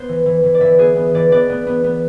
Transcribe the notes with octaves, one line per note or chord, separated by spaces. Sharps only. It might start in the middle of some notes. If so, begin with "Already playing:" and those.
Already playing: B3 C5
E3
E3
E3
D5
E3 E5
B3 G#4
B3
E3 D5
B3 D5
B3
B3
B3